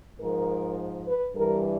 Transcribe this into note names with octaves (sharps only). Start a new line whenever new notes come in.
G#2 F3 A#4
B4
G2 E3 G3 A#4